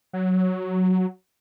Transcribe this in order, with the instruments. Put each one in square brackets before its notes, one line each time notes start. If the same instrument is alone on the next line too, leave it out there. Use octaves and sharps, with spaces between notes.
[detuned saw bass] F#3